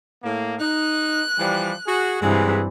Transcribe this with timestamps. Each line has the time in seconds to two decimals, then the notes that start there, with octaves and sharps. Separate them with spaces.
0.23 A2 A#3
0.60 D#4 F#6
1.38 E3 F3 G3
1.87 F#4 G#4
2.21 G2 C3 E3 G#3 F#4 G#4